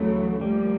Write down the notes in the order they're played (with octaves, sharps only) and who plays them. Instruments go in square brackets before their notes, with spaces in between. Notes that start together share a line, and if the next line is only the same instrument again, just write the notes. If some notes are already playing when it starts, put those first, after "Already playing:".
Already playing: [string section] D2 C#3 E3 A3 [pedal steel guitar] F#3
[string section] A2 F3 A#3 [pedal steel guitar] G3